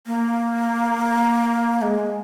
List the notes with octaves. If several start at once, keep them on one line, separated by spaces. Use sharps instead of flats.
A#3
G#3